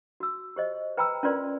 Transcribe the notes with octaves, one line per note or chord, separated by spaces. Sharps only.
F#4 E6
G4 C5 D#5
B4 G5 A#5 B5 E6
C#4 F4 A#4 B4 D5 C6